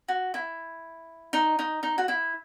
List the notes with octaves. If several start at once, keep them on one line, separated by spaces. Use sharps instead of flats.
F#4
E4
D#4
D#4
D#4
F#4
E4